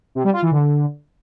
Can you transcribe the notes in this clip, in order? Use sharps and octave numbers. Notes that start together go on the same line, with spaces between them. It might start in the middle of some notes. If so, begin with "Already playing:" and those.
C3
G3
F4
E3
D3